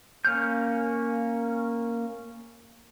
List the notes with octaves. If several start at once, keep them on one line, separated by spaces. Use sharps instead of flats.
A#3 C#4 F6 G6